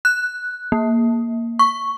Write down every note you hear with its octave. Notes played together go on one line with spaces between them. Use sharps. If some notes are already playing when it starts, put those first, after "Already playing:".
F#6
A#3
C#6